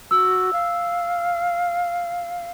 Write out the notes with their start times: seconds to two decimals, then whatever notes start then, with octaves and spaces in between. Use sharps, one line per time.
0.11 F#4 E6
0.53 F5